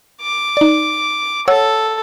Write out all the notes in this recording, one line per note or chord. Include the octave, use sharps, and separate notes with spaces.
D6
D#4 D5
A4 C#5 F#5 E6